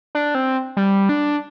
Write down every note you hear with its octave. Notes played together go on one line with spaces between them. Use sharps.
D4
C4
G3
D4